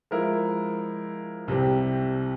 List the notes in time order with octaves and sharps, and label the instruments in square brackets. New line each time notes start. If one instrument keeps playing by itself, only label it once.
[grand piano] F3 G#3 E4 A#4
C2 C3 G3 C4 G4